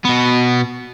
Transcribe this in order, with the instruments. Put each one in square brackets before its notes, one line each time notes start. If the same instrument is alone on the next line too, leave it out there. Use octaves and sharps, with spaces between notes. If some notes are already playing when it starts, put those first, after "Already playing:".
[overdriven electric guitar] B2 B3